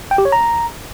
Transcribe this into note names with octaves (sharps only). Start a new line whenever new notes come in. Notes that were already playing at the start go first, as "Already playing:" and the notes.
G5
G4
C#5
A#5